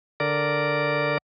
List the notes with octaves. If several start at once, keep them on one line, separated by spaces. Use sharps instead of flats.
D3 A#4 D5